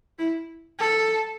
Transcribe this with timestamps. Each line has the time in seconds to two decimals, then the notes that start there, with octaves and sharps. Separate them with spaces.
0.19 E4
0.79 A4